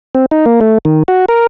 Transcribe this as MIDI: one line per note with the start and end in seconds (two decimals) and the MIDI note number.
0.15 0.26 60
0.31 0.45 63
0.46 0.60 58
0.61 0.78 57
0.85 1.03 51
1.08 1.25 66
1.29 1.47 70